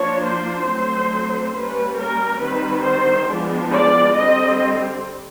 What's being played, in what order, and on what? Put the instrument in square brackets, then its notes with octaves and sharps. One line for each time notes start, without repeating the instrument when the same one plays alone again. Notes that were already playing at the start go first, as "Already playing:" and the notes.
Already playing: [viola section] F3 A#3 D4 C#5
C5
D3 F#3 A3 C4
G3 A#3 C#4 B4
A#4
D#3 G3 C4 B4
C5
F3 G#3 B3 D4
D5
D3 G3 C4 D#5